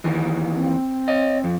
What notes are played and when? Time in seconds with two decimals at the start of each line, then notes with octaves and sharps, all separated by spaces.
0.04 D#2 D#3 E3
0.54 C4
1.08 C#5 D#5
1.44 F2